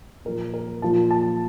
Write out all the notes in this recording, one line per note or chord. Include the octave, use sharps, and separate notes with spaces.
A#2 F3 A#4
A#4
A#2 F3 A5
A5